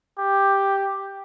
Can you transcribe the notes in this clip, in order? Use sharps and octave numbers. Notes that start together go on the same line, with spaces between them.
G4